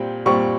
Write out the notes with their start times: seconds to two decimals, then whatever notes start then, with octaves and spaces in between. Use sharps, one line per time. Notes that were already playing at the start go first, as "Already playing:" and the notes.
Already playing: A#2 G3 C4 G5
0.26 A#2 G3 C4 C#6